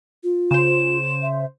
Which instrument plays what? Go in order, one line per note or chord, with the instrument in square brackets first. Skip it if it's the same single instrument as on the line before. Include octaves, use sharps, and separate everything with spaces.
[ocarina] F4
[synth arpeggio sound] C#3 C5 [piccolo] E7
[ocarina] E5